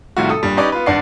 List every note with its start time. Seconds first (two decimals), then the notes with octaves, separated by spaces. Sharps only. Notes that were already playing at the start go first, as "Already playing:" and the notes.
0.17 A2 C3 D#3 G3 F4 F#4
0.29 A4 D#6
0.43 G2 A#2 G3
0.57 C#4 D#4 G4 B4 D5
0.72 B3 F4 B4
0.86 G#1 G2 D5 F#5 C7